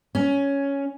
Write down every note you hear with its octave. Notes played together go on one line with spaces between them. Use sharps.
C#4